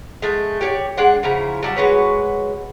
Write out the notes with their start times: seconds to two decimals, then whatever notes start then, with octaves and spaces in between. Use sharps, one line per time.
0.22 G#3 A3
0.61 G4 C#5 D5
0.97 G#3 D4 F#5
1.23 C#3 F3 E4 A#5
1.63 F#3 G3 A5
1.76 G#3 F#4 B4 C#5